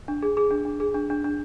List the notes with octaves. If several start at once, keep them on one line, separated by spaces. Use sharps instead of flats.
D4
G#4
G#4
D4
D4
G#4
D4
D4
D4